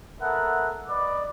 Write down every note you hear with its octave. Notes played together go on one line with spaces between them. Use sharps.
B3 A4 A#4 E5 F#5
B4 D5 D#5 D6